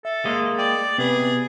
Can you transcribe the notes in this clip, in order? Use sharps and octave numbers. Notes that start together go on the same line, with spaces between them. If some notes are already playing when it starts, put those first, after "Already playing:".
A4 E5
G#3 A#3 D#5
D5 G5 D#6
C3 B3 G#4 B4